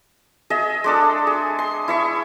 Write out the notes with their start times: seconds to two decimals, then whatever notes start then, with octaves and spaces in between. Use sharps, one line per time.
0.50 G#4 D#5 E5
0.84 G#3 D4 A4
1.27 G#4
1.59 C6
1.88 E4 E5 C#6